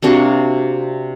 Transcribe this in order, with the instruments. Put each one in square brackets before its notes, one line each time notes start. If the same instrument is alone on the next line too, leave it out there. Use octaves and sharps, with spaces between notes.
[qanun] C3 A#3 D4 F#4